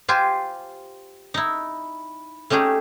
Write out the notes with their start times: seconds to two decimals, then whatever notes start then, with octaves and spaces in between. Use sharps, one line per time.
0.08 F4 G4 C5 G#5
1.34 D#4 E4
2.50 A3 C#4 D#4 G4 G#4